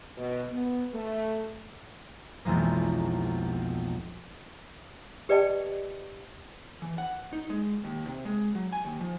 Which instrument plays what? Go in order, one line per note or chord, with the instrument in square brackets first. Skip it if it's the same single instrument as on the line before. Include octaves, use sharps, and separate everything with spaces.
[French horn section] B2
B3
A3
[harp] B1 F2 E3 G#3 A#3
[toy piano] G4 B4 D5 D#5 G5 A5
[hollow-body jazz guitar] E3
F#5
D#4
G#3
D#2
C3
G#3
F#3
G#5
D#2
F3